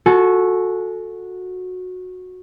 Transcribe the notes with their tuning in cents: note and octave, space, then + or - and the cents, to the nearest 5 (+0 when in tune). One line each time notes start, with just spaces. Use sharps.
F#4 -15 A4 +5 G#5 +40